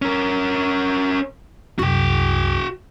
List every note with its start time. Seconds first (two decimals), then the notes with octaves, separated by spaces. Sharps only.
0.02 C#4 A#4
1.79 C2 F#2 F#4 G5